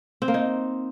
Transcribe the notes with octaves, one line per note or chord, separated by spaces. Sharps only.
C4
A#3
D#4